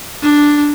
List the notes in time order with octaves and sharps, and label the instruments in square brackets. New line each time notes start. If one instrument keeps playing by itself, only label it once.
[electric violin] D4